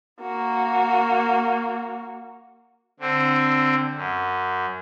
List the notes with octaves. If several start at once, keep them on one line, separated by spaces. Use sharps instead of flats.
A#3 F#4
D3 C4
F#2